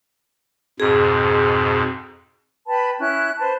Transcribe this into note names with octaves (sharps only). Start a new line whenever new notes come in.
F2 G#2 B2 G#4
B4 G5 A5 B5
C#4 E4 F#6
B4 C5 A5